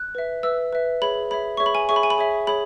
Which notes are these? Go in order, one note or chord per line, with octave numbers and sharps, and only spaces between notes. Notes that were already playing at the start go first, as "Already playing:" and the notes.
Already playing: F#6
B4 E5
B4 E5 E6
B4 E5
G#4 C#5 E5 B5
G#4 C#5 E5 B5
G#4 C#5 E5 C#6
B5
G#5
G#4 C#5 E5 C#6
B5
G#5
B5
G#4 C#5 E5
G#4 C#5 B5